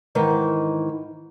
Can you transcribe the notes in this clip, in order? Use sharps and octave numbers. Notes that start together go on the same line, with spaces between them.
G#2 D#3 E3